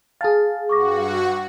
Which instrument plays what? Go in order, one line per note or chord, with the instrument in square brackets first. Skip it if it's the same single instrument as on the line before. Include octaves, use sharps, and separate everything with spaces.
[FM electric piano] G#4 F5 [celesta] G#5 A5 A6
[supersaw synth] G2 F#4 [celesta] C#6 D6 A#6